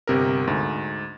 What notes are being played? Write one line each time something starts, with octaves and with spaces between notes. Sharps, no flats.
G1 C3 A#4
D2 G#2